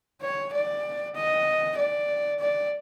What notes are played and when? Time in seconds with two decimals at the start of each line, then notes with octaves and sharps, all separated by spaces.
0.21 C#5
0.53 D5
1.15 D#5
1.77 D5
2.40 D5